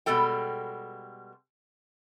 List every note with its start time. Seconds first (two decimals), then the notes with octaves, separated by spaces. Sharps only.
0.06 B2 G3 G#3 A4 G5